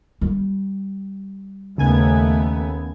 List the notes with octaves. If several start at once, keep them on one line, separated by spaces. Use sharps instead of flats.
G3
D#2 C#3 A3 B3 G#5 G#6